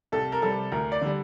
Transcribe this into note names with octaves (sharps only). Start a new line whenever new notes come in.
C2 A4
A#4
C3 G3 A4
D2 A#4
D5
D3 G3